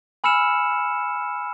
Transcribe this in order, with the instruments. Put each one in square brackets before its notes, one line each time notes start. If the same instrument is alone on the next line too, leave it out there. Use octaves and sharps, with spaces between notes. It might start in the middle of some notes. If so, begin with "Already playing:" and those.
[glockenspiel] G#5 B5 E6 F6 C#7 E7